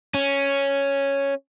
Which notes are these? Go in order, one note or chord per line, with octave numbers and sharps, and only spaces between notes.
C#4